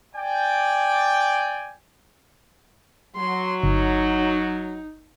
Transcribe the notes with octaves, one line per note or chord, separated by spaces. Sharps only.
D5 G5 G#5
F#3 C6
G1 D#4